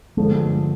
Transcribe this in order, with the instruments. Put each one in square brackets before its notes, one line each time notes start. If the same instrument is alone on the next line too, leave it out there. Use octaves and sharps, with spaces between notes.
[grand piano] G2 D3 F3 A3 [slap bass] G#3